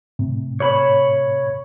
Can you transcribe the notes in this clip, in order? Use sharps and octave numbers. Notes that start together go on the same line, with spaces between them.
A2 C3
C#5 B5